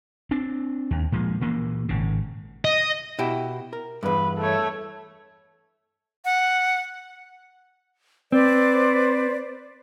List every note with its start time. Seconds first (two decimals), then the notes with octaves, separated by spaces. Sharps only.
0.31 C4 D4
0.91 D#2
1.12 A#2 F3 G#3
1.41 A#2 E3 A#3
1.89 G#1 C#3
2.65 D#5
3.19 B2 E4 G4
3.73 A#4
4.03 E2 G2 B4
4.38 A3 C#5
6.25 F#5
8.32 C4 B4 C5 D5